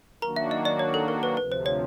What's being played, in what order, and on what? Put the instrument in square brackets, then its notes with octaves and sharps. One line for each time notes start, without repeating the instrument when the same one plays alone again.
[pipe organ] D#3 F#3 A#3 D4 F#4 [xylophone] A#4 A#5
[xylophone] E5
D#5
D5
C#5
A4
A#4
B4
[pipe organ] D2 C3 F3 [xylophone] B4
[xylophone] C5
C#5